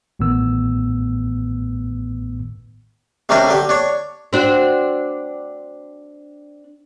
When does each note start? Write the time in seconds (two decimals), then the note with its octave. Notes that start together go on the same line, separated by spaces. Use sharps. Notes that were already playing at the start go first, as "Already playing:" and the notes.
0.19 A1 A2 D#3 B3 E6
3.29 C3 D#3 G3 C#4 D4 A#4
3.47 D3 G4
3.69 D4 C#5
4.33 C4 D4 F#4